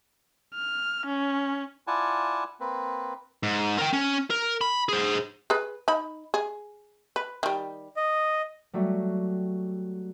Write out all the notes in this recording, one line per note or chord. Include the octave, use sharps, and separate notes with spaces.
F6
C#4
E4 F4 D5 F#5 G#5 A5
A#3 C4 B4
G#2
A#4 G5
C#4
A#4
B5
G#4 C5
G#4 B4
D#4 B5
G#4
B4
D#3 G3
D#5
F#3 G3 A3 F#4